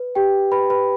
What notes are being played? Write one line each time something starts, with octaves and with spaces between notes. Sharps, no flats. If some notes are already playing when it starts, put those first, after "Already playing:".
Already playing: B4
G4 G5
B4 B5
B4 B5